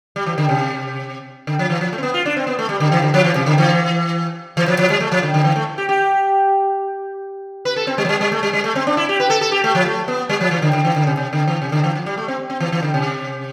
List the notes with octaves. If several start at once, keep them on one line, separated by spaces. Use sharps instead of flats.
G3
E3
D3
C3
D3
F3
E3
F3
A3
C4
B3
F4
D4
C4
B3
A3
G3
D3
E3
D3
F3
E3
C3
D3
E3
E3
F3
F3
G3
A3
F3
D3
D3
E3
A3
G4
G4
B4
A4
C4
G3
F3
G3
G3
A3
G3
G3
A3
C4
D4
E4
G4
B4
A4
A4
G4
A3
F3
A3
B3
G3
F3
E3
D3
D3
E3
D3
C3
C3
D3
E3
C3
D3
E3
F3
G3
A3
C4
C4
E3
E3
D3
C3